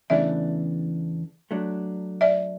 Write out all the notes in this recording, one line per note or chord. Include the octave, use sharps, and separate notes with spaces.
E2 C#3 E3 A3 D4 D5 E5
F#3 A3 D4
D5 E5